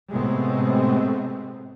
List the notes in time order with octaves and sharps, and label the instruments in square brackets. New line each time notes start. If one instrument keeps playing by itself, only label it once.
[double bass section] A2 C3 G#3 A3 B3 C4